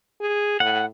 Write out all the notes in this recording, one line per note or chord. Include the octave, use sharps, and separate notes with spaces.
G#4
A2 F#5